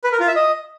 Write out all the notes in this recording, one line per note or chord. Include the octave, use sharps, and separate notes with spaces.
B4
A#4
F4
E5
D#5